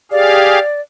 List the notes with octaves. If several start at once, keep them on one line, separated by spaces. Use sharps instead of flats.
G4 G#4 D5 F5